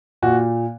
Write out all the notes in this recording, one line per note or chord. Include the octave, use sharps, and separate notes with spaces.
A#2 F#4